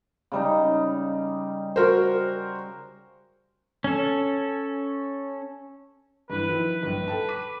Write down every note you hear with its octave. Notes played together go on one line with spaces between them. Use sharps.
C#3 G3 D#4
F#4 A#4 C5
C#4 A4
G2 E3 B4
D#3 F3 E4
A#1 G2 B4
A4 G5 A5
D6 B6 D#7